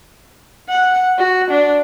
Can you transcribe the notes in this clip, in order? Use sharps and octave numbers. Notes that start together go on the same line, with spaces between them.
F#5
F#4
D4